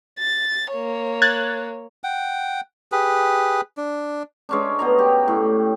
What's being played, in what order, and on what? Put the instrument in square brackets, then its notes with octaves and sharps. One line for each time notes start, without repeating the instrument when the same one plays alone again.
[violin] A6
A#3 C#5
[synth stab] F#6 G#6 A6
[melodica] F#5 G5
G4 G#4 B4
D4
[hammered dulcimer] G#3 C#4 D4
B2 D#5 A#5
G4
A2